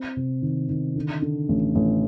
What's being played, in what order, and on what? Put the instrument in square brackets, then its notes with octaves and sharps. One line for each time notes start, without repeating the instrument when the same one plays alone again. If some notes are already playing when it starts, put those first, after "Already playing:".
Already playing: [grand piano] C4
C3
D#3
D#3
D3
D3
A1
A1